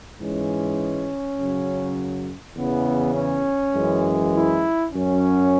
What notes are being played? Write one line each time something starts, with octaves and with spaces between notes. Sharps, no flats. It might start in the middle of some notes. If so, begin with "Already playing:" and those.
G#2 E3 G#3 C#4
F#2 C#3 F#3
E2 C#3 E3 B3
C#4
F#2 E3 G#3
E4
F#2 F#3 C#4